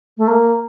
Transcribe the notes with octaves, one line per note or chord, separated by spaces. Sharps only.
A3
A#3